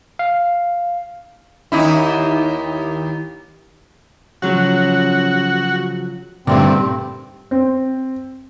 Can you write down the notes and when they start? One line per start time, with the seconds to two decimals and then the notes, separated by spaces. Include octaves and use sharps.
0.19 F5
1.72 D#2 D#4 E4
4.42 C#3 F3 F#3 F#4
6.47 G2 A#2 D3 D#3 A3 C4 E4
7.51 C4